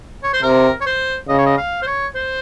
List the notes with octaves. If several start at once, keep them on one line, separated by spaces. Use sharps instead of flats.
C#5
C5
C3 A#4
C#5
C5
C#3 D#5
C#5
D#5
F5
C5
C#5
C5